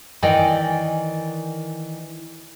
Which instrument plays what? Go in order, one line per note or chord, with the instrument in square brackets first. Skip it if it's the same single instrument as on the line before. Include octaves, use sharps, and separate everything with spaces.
[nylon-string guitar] D#3 E3 D5 D#5 G5 G#5